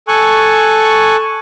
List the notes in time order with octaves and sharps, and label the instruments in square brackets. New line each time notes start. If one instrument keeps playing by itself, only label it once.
[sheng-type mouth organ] A4 G#5 C#6 F#6